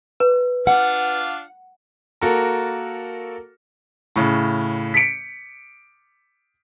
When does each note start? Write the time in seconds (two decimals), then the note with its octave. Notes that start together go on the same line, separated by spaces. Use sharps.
0.20 B4
0.67 D4 F4 F5 F#5
2.22 A#3 F#4 A4 A#4
4.16 A2 C#3
4.94 B6 C#7 D7